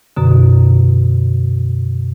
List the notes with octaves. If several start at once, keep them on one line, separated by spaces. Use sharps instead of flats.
F#2 B2 D3